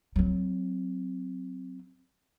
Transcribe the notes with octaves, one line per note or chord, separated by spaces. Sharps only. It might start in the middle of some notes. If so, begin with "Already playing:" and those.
F#3 C4